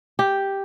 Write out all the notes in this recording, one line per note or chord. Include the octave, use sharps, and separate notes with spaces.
G4